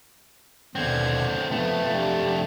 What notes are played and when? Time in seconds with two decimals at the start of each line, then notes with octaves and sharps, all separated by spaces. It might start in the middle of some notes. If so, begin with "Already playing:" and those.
0.75 D#2 B2 D3 C4 G#6
1.51 F2 F3 A3 B3
1.93 D4 G4